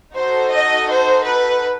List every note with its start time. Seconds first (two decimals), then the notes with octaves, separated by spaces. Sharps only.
0.16 D#4 F#4 A4 C5
0.53 D#5
0.89 C5
1.25 B4